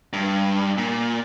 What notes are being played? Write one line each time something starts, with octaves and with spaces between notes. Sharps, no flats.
G2
A#2